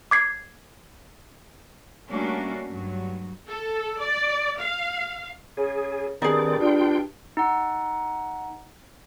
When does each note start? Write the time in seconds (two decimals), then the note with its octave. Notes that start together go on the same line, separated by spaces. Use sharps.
0.11 D6 G#6 C7
2.09 G3 A3 A#3 C#4 D4 F#4
2.70 G2 F#3
3.48 A4
4.00 D5
4.58 F5
5.57 C#3 G#4
6.22 G2 D#3 C4 D#4 G#4 D5
6.60 D4 F4 G5
7.37 D#4 F#5